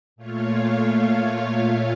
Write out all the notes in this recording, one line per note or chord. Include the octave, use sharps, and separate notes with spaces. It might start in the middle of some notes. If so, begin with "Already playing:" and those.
A#2 A3 F4 C#5 F5